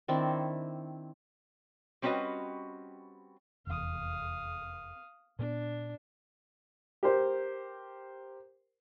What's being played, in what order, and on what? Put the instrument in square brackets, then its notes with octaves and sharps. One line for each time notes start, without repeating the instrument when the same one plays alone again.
[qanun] D#3 C4 D4 E4
[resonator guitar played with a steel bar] G3 C4 C#4 F#4 B4 D#5
[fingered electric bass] F1 E2 [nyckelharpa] F5 D#6
[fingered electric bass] A#2 B3 [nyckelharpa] D4
[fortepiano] G4 A#4 C5